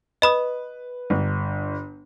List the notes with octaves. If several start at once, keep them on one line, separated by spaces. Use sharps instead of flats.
B4 D#5 B5 D#6
G1